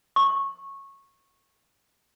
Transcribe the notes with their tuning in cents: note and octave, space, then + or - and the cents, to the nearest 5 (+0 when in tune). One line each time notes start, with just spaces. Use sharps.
C#6 -15